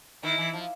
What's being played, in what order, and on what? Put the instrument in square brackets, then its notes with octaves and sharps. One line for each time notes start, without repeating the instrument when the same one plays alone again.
[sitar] D#3 [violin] E4
[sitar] E3
F3